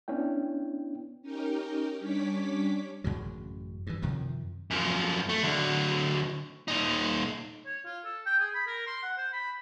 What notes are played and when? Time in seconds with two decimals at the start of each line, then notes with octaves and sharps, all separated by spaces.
0.08 B3 C#4 D4 E4 G5
1.22 C#4 D#4 G4 A#4 G5
1.99 G3 C#4 D4 C#5 D6 B6
3.04 A1 F#2 C#3 F#3
3.87 G2 E3
4.02 F#2 C3 D#3 F3
4.71 F#2 F3
5.29 A3
5.43 D3 F#3
6.68 A#2 D#4
7.66 C#5
7.85 F4
8.05 A4
8.26 G5
8.40 G#4
8.54 B5
8.67 A#4
8.87 C6
9.03 F#5
9.17 C5
9.33 B5